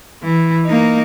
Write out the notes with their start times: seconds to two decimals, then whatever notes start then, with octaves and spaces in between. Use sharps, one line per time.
0.24 E3
0.66 A#3 D#4